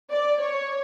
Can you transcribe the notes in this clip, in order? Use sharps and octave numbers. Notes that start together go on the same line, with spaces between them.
D5
C#5